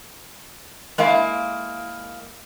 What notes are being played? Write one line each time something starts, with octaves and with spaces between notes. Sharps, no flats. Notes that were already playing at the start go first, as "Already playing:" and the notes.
G#3 A#3 E4 F5